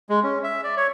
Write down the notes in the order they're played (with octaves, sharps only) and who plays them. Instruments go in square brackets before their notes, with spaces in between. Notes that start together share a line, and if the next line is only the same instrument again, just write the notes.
[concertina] G#3
C#4
E5
D5
C#5